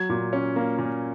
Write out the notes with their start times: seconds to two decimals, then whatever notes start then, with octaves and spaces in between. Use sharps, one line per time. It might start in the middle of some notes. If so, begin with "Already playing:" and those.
Already playing: F#3 G#6
0.10 A#2
0.33 C#4
0.56 A#3
0.79 A#2